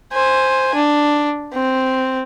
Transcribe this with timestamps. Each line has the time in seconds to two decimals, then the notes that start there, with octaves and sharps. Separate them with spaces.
0.13 C5 G#5
0.75 D4
1.53 C4